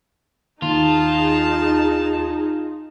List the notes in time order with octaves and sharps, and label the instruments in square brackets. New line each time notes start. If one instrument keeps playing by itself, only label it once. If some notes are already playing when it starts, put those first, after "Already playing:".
[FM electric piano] D#2 [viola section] D#4 G#4 [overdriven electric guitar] F4 [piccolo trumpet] A5